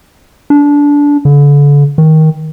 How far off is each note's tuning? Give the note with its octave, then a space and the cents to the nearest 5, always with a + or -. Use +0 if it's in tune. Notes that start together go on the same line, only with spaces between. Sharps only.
D4 -20
D3 -35
D#3 +20